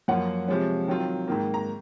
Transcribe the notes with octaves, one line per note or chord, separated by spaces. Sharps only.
F#2 F3 A#3 C#4 F4 F#5
C3 F3 G#3 C#4
D#3 F#3 C4 F4
G#2 D#3 A#3
A#5